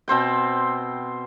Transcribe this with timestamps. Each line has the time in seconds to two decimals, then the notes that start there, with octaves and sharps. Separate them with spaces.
0.08 B2 C4 C5 G5